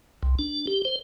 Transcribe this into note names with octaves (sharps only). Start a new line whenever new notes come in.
C2
D4
G4
C5